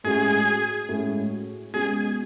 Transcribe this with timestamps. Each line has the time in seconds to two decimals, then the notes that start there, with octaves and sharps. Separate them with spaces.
0.04 A2 G#3 C#4 F#4 G#4
0.89 A2 G#3 C#4 F#4
1.73 B2 G#3 C#4 F#4 G#4